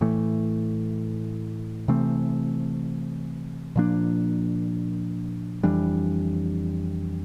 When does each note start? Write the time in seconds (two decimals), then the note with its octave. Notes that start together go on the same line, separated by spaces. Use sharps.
0.01 A2 E3 A3
1.88 C3 E3 A3 C4
3.76 A#2 F3 A#3 D4
5.63 F2 E3 G3 D4